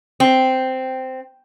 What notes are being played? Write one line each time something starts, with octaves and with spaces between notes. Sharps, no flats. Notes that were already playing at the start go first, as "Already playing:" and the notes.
C4